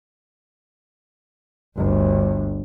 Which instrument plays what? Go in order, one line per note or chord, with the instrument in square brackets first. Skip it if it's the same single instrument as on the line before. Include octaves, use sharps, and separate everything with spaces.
[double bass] G1 D2